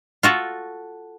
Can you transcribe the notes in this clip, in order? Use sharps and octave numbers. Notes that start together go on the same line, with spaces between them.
F4 F#4 A4